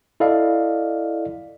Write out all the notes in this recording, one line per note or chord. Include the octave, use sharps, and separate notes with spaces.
E4 A4 D5 D#5 F5